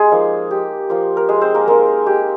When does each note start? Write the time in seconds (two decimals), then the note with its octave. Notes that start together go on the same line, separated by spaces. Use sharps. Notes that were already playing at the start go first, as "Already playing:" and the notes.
Already playing: G#3 F4 G#4
0.11 F3 A#3 D#4
0.51 G4
0.89 F3 A#3 F4
1.17 A#4
1.29 G#3 G#4
1.41 C4 C5
1.54 A#3 A#4
1.67 G#3 A#3 D#4 A#4
2.06 G4